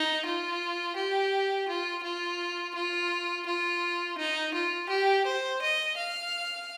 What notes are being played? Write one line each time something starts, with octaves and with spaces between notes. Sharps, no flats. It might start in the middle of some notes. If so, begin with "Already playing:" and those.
Already playing: D#4
F4
G4
F4
F4
F4
F4
D#4
F4
G4
C5
D#5
F5